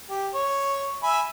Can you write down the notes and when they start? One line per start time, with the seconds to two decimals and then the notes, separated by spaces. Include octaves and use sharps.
0.10 G4
0.34 C#5
1.03 E5 G#5 B5